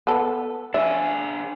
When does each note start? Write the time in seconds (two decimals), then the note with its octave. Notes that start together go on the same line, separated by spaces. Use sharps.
0.07 B3 A4
0.74 D4 G#4 E5